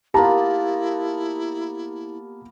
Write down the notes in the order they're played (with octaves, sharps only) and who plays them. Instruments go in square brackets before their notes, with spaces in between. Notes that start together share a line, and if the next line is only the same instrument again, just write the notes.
[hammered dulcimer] A#3 B3 F4 [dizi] E4 [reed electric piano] G4 A#4 [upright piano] A5 A#5